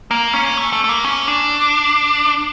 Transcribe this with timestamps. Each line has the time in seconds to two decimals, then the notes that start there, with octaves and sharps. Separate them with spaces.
0.11 A#3
0.34 C#4
0.57 A3
0.73 A3
0.84 A3
0.89 A#3
1.04 C#4
1.28 D4